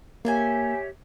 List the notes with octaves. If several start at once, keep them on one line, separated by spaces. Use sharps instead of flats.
A#3 G4 G#4 C5 C#5 E5 G#5